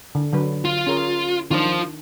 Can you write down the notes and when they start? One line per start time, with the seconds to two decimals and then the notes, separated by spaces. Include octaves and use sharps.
0.15 D3
0.33 D3 F#3 B4
0.65 F4
0.87 C#4 G#4 A#4
1.51 D#3 D4 F4 C5